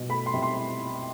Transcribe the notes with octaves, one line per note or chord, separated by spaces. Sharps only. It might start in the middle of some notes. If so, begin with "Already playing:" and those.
Already playing: B2
A3 B5
C6
C3
C6